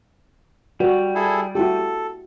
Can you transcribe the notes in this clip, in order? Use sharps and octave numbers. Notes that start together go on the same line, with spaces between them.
G3 F#4 B4 D5
E4 G#4 A4
E4 F#4 G4 A4